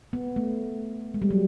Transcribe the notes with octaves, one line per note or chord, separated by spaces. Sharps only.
B3
A3
G#3
G3
F#3